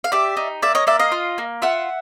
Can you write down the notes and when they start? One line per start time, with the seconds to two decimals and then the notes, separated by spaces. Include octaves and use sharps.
0.04 F5
0.12 G4 D5 E5
0.37 D#4
0.62 A#3 D5 E5
0.75 C#5 D#5
0.87 A#3 D5 E5
0.99 D#5 F5
1.12 F4
1.38 A#3
1.62 F4 E5 F#5